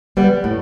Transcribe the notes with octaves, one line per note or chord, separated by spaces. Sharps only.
G3 B3
A2